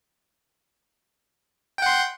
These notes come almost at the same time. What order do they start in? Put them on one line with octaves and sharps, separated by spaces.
G5 F#5 C6